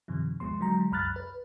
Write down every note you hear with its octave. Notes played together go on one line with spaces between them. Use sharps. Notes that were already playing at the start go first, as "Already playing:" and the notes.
G2 C3 D#3 F3
G1 D#2 F3 G#3 B3 C6
D3 F#3 G#3 A#5
C2 F#2 B5 F6 F#6 A6
B4